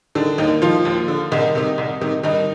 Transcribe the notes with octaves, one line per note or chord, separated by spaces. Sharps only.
D3 D#3 D4
D#2 D#3 D#4
D#3 F3 F4
D#2
D3
C2 D#3 D#4
C3 D#3
C2
C3 D#3
G2 D#3 D#4